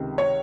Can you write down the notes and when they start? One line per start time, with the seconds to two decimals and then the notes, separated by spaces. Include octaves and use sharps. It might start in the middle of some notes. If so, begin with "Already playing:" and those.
Already playing: C#2 C3 D#3
0.18 C#5